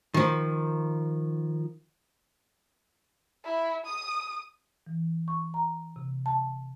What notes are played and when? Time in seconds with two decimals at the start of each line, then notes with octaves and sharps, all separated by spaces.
0.14 D#3 F3
3.45 E4
3.86 D#6
4.87 E3
5.28 C#6
5.54 A#5
5.96 C3
6.26 A5